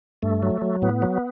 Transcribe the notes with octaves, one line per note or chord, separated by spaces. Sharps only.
G2 A3
F#3
F#3
A2 B3
F#3